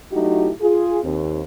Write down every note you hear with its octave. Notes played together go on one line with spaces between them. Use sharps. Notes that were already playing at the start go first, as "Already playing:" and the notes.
F#3 A3 D#4 E4 F#4 G4
F4 G#4
D#2 C4